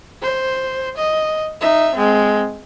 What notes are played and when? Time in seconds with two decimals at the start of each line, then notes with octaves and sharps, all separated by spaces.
0.22 C5
0.97 D#5
1.61 D#4 E5
1.95 G#3 C4